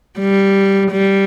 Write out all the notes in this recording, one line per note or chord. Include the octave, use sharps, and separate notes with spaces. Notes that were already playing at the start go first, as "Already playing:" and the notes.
G3
G3